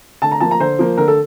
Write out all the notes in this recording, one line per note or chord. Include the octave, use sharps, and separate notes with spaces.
D3 A5
A#5
F3 A#3 A5
A#5
D3 C5
F3 A#3
D3 A#4
A4